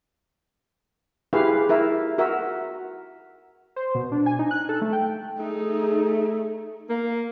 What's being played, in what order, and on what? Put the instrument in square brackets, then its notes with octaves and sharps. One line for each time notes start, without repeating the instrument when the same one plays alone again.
[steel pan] E4 F4 G4 G#4 B4 F5
E4 A#4 E5
F#4 A#4 E5
[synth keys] C5
B2
D4
G#5
D#4
F#6
A4
A3
G5
[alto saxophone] A3 [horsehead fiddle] D#4 G#4
[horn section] A#3